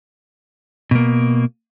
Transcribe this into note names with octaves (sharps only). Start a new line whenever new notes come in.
B2 A#3